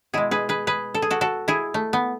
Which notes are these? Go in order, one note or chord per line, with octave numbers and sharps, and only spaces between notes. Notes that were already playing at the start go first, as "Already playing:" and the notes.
B2 G#3 E4 G#4
G#4 B4
G#4 B4
G#4 B4
A4
G#4
F#4 A4
F#4 A4
E4 G#4
A3
B3